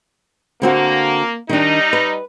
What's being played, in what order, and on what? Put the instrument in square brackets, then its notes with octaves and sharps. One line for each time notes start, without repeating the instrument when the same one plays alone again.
[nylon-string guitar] D3 C4 F#4 [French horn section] A#3
[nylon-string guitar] D#3 D4 [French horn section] G3 D#4
[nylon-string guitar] B4